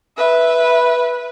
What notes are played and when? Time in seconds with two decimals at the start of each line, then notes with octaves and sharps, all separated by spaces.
0.17 B4 E5